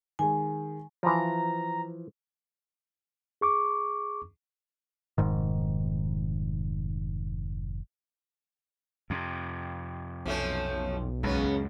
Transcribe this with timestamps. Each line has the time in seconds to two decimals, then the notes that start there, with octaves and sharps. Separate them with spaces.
0.19 D#3 G#3 G#5
1.03 E3 F3 A#5
3.41 G#4 C#6 D6
5.18 F1 G#2 D#3
9.10 F2 C3
10.26 B1 F3 A3 C#4
11.23 C#2 F#2 C#3 B3 C#4